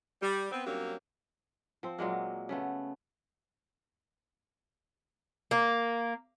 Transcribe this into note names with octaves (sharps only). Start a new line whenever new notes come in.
G3
B3 C4
G2 F#3 A#3 C4 C#4 G4
F3 C4
A#2 F#3 G#3 A#3
C#3 A3 B3
A#3